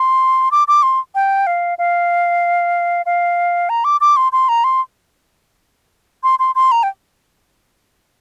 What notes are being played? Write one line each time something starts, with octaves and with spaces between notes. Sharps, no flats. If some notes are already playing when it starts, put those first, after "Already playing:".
Already playing: C6
D6
D6
C6
G5
F5
F5
F5
A#5
D6
D6
C6
C6
A#5
C6
C6
C6
C6
A#5
G5